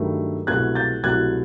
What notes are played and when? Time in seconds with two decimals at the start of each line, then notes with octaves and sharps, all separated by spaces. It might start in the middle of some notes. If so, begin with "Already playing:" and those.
Already playing: G2 D#3 F#3 A3
0.47 C2 B2 F#3 A3 F#6 G#6
0.75 G6 A6
1.03 C2 B2 F#3 A3 F#6 G#6